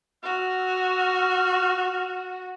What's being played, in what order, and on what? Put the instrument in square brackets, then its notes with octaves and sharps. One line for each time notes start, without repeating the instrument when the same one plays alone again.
[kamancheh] F#4 [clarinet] F6